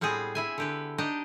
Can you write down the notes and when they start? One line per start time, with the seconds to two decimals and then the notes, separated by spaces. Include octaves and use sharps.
0.01 A2 G3 B3 C4 G#4
0.35 E4 E5 G#5
0.58 D3 G4 B4
0.98 D4 D#4 G4 D#5